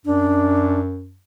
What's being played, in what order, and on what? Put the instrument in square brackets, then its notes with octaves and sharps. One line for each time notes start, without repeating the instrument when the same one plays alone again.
[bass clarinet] F#2 [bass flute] D4